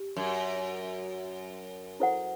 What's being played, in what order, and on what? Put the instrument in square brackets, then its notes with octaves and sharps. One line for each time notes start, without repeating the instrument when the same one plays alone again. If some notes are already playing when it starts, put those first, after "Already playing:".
Already playing: [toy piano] G4
[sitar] F#2
[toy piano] E4 A4 C5 F#5